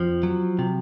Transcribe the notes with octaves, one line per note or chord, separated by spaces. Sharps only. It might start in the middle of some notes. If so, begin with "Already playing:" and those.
Already playing: F2 F3
F#3
C3